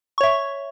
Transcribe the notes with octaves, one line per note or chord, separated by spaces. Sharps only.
C#5 E5 C#6